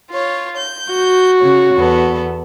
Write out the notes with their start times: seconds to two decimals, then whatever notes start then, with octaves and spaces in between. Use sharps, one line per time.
0.11 F4 C#5
0.57 G6
0.94 F#4
1.40 C#3 C#5
1.76 E2 B3 A4